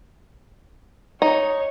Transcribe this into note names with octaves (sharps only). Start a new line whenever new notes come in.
D#4 C#5